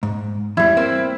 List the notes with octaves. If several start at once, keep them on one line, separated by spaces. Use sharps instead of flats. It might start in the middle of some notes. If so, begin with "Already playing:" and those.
G#2
E2 G3 E4
A#3 C4